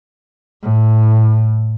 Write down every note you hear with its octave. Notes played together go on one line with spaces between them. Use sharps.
A2